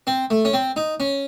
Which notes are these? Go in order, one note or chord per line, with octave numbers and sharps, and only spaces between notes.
C4
A3
C#4
C4
D#4
C#4